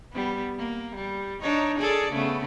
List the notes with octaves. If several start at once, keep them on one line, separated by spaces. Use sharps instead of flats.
G3 B3
A#3
G3
D4 D#4 C#5
G#4 A4 D5
C#3 A3 B3